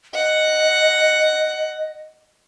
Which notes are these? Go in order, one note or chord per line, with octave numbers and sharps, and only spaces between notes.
D#5 F#5